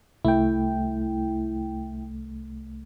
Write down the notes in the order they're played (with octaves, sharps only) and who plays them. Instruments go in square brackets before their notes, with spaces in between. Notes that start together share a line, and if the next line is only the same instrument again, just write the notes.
[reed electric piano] C2 A3 [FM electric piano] E4 G5